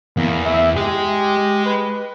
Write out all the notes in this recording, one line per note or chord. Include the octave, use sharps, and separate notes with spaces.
E2 A#3
E5
G4 G#4 D#5
B4